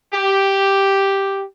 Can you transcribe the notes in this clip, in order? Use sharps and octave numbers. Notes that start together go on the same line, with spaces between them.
G4